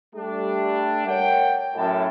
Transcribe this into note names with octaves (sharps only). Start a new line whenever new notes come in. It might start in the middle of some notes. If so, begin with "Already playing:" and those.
G3 A3 D4
A#4 C#5 F#5 G5
F#2 A2 A5